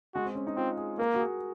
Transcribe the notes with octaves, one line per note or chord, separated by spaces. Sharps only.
G#3 F#4
C4
C#4
D#4
C4 F4
G#4
A#3 A#4
F#4
G#4